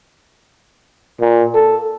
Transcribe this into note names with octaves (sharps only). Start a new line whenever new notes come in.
A#2
A4